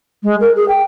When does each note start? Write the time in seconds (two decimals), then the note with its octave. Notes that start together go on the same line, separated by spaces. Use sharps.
0.23 G#3
0.40 A#4
0.56 G#4
0.68 G5